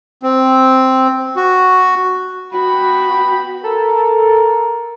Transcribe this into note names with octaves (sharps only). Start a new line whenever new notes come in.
C4
F#4
B3 F#4 G5 B5
A4 A#4